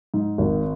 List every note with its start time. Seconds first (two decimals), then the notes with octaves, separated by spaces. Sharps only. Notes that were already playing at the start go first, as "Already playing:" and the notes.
0.14 G#2
0.38 G#1